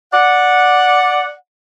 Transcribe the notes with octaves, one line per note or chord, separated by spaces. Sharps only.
D5 F#5